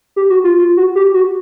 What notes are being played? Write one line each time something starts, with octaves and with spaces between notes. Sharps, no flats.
G4
F#4
F4
F4
F#4
G4
F#4